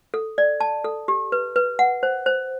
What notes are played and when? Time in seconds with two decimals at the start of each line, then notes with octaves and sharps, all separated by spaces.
0.14 A4
0.38 D5
0.60 A5
0.85 A4
1.08 G4
1.32 B4
1.56 B4
1.79 F#5
2.03 C5
2.26 C5